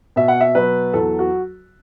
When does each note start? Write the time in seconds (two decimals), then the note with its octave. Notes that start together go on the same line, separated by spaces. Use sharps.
0.16 B2 E5
0.28 F#5
0.41 E5
0.55 F#3 B4
0.93 E2 A4
1.19 F#4